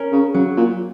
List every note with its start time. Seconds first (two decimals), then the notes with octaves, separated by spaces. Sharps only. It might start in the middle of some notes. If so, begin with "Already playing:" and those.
Already playing: C#4 A#4
0.12 C#3
0.34 C#3 F#3
0.57 A#2